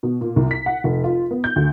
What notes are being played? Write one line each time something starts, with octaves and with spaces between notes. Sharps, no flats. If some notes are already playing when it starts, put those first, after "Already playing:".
B2
A#2
C2
B6
F#5
F1
F4
B3
G6
D2